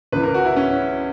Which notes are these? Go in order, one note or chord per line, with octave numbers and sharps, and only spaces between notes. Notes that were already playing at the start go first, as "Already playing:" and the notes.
C#2 C#3 E3 B4
A#4
F#4
E4
C#4